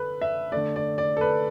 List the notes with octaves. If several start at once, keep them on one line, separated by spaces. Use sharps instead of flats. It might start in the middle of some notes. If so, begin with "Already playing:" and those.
Already playing: D3 A4 B4
E5
D3 A3 D5
D5
D5
A4
B4